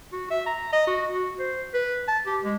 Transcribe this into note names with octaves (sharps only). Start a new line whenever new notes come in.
F#4
E5
A#5
D#5
F#4
F#4
C5
B4
A5
G4
G#3